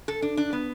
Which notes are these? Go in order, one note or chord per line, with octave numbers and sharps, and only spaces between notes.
A4
D4
D4
B3